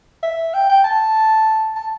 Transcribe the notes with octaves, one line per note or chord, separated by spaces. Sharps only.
E5
G5
G5
A5
A5